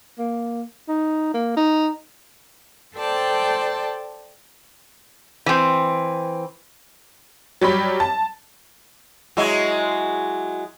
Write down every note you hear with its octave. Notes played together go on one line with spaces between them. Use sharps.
A#3
D#4
A#3
D#4
A4 C5 D5 G5 A5
E3 C4
F#3 G3 C#5 B5
A5
F#3 G#3 E4